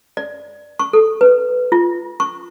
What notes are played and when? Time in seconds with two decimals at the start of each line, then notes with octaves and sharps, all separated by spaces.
0.17 D5
0.79 C#6
0.93 A4
1.21 B4
1.72 F4
2.20 C#6